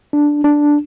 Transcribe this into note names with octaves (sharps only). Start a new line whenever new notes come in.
D4
D4